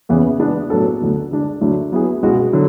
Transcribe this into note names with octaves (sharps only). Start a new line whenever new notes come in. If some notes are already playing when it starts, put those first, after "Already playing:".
E2 C#3 E3 B3
G#3 B3 D4
A2 F#3 B3 D4 A4
D2 D3 F#3
D3 G#3 D4
D2 D3 F#3 A3 D4
F#3 B3 E4 G#4
C#2 B2 G#3 B3 F#4
D3 F#3